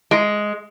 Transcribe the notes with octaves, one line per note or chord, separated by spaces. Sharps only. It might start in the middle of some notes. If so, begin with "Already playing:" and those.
G#3